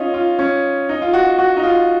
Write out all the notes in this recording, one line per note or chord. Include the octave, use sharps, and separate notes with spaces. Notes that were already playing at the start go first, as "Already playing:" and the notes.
Already playing: C#4 D#4 F4
F4
C#4
D#4
F4
F#4
F#4
D#4
F4